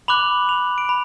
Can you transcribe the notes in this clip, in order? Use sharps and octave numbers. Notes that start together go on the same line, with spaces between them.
B5 D6 F#6 F#7
F7
D7
B5